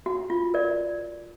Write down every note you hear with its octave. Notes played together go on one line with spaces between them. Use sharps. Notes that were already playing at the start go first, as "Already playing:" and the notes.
F#4
F4
A#4 D5